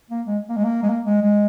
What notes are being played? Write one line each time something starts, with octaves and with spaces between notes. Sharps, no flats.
A#3
G#3
A#3
G#3
A#3
G#3
A#3
G#3
G#3